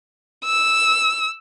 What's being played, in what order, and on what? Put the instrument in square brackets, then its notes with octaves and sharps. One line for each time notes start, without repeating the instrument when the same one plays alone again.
[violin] E6